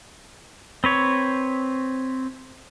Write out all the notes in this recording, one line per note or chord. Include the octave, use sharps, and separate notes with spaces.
C4 B4 C#5